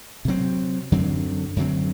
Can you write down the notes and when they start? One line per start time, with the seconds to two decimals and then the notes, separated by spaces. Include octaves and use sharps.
0.25 C3 F#3 C4
0.92 F#2 D3 F#3 C4
1.56 F#2 D3 F#3 C4